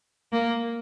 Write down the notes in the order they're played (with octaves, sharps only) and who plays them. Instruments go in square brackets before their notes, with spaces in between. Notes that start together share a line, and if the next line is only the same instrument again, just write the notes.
[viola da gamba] A#3